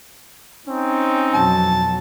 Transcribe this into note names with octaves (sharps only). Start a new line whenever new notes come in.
C4 C#4 D#4
F2 B2 F#3 A5